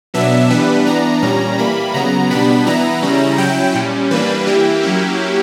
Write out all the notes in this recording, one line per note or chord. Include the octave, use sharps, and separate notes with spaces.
B2 F#3 B3 D4 E5
E3 G3 B3 D4 B4
E3 B3 D4 A#5
A#2 G3 C#4 A#5
E3 G3 A#3 B5
C#3 F#3 B3 A#5
B2 G3 B3 D4 B5
E3 B3 E4 A#5
C#3 G3 C#4 E4
F#3 C#4 E4 G5
A#2 G3 C#4
E3 G3 A#3 D4 B4
E3 A#3 E4 G4
F#3 A#3 C#4 E4